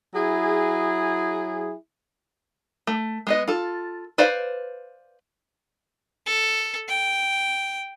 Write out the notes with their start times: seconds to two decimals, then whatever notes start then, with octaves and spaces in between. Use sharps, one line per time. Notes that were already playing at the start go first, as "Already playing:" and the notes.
0.15 F#3 E4 G#4
2.87 A3
3.27 G#3 B3 D#5
3.48 F4 A4
4.18 B4 C5 D5 E5 F5
6.27 A4
6.88 G5